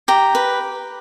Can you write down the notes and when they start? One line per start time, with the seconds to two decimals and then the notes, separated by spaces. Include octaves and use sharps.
0.08 G4 A#5
0.35 B4